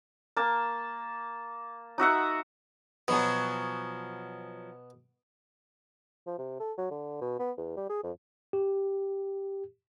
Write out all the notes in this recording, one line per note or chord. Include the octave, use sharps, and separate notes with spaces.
A#3 A5
D#4 F#4 E5 F#5
B2 F3 F#3 G#4
F3
C3
A4
F#3
D3
B2
B3
E2
G3
G#4
F2
G4